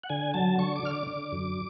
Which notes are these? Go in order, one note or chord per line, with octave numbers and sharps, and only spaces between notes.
F#5
D3 G#5
F#3 A5
D3 C#6
D6
D3 F6
D6
D3
F#2